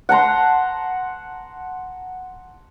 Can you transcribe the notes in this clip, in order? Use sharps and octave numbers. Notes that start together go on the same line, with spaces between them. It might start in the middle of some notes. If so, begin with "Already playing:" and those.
F#5 A5 A#5 C6